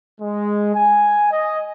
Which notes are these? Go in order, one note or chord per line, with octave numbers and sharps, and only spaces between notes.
G#3
G#5
D#5